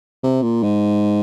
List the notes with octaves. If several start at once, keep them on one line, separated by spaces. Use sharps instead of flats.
C3
A#2
G#2